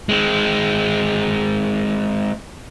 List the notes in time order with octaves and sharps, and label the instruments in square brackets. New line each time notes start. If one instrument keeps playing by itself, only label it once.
[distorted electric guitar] G#3 C4